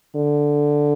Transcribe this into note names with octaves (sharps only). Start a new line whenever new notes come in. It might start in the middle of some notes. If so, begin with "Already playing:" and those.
D3